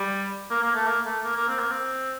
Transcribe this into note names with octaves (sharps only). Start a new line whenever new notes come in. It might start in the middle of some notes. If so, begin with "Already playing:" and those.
Already playing: G3
A#3
A#3
A3
A#3
A3
A#3
A#3
C4
A#3
C4